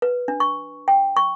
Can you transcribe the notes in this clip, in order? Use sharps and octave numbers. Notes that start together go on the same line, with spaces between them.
B4
D4
C#6
G5
C#6